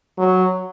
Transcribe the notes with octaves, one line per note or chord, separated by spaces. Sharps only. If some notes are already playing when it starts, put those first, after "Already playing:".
F#3